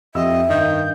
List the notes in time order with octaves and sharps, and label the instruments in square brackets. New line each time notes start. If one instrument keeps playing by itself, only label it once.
[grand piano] F2 G4 E6 [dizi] D#5 [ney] E5
[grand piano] G2 [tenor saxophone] D#3 [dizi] G6